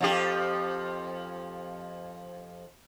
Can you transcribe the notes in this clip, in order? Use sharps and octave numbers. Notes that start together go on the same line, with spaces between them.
F2 F3 G4